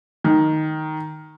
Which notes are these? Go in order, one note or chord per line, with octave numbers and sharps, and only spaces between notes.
D#3